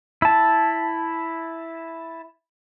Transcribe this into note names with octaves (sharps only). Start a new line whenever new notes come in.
E4 A5